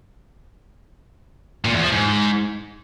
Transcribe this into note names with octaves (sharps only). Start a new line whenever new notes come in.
A#2
E2
F3
G#2